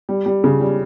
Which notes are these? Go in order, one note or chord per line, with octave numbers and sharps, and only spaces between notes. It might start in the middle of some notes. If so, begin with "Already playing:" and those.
G3
G3
C#3
G3